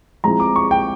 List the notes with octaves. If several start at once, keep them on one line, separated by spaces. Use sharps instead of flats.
F3 G#3 C4 E4 A#5
D6
C#6
G5